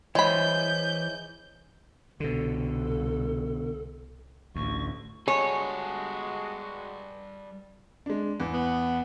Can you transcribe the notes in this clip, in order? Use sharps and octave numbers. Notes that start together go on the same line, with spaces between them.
E3 G#3 E4 C5 C#5 B5 G6
C2 B2 D3 A4
A1 D2 C#6
G3 G#3 F#4 G#4 A4 C#5
G#3 D4
E2
B3